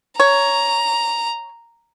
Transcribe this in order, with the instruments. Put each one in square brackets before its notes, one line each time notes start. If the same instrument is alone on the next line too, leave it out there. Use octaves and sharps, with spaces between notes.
[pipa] C#5 [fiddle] A#5